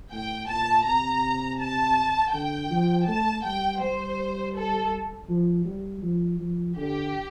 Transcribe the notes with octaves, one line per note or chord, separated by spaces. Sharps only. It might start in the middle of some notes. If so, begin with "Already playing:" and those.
A2 G5
A#2 A5
C3 A#5
A5
D3 G5
F3
A3 A5
G3 G5
G3 C5
A4
F3
G3
F3
F3
D3 G4